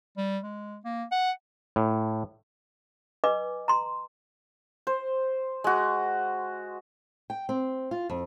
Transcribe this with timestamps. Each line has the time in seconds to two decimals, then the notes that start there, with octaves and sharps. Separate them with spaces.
0.17 G3
0.44 G#3
0.85 A#3
1.12 F#5
1.76 A2
3.24 B4 D#5 G#5 D6
3.68 A#5 C6
4.87 C5
5.64 G#3 F#4
7.30 G5
7.49 C4
7.91 F4
8.10 F2